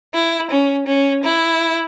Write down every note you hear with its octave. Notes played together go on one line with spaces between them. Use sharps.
E4
C#4
C#4
E4